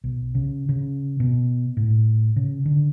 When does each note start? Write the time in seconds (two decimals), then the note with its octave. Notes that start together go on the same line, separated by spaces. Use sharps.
0.04 B1
0.35 C#3
0.69 C#3
1.20 B2
1.77 A2
2.36 C#3
2.66 D3